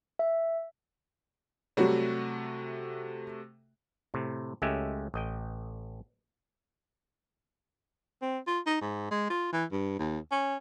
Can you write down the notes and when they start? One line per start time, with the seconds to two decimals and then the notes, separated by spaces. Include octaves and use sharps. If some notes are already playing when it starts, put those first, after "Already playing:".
0.19 E5
1.77 C3 F#3 G3 A3 F#4
4.14 A2 C3
4.62 C#2 G#3 A3 C#4 G4 E5
5.14 A1 D#5 G5
8.22 C4
8.47 F4
8.67 D#4
8.82 G#2
9.11 G#3
9.30 F4
9.53 E3
9.72 G2
9.99 D#2
10.32 C#4